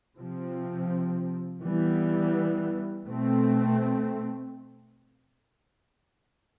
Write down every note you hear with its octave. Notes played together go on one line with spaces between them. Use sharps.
C3 F3 C4
E3 G3 B3
B2 A3 C4